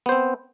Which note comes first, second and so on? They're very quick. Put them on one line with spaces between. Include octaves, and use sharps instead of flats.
B3 C5 C4